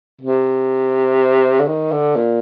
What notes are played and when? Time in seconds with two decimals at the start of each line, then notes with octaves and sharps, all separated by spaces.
0.21 C3
1.60 D3
1.67 D#3
1.92 D3
2.16 A#2